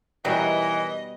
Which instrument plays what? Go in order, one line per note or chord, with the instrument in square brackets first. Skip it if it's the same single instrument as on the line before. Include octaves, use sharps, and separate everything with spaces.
[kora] B2 G3 F#4 [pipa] D#3 F#3 [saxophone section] E3 [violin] D#5